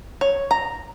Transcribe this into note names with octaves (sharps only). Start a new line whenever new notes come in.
C#5
A#5